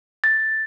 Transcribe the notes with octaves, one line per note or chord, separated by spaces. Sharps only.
A6